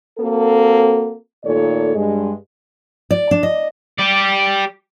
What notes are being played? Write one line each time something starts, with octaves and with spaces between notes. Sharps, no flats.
A#3 C4 F#4 A4
A#2 D#3 A3 A4 C#5 D5
G2 G#3
D5
D4
D#5
G4 D5